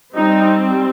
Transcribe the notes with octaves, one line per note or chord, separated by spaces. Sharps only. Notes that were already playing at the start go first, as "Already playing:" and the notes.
G3 C4 D#4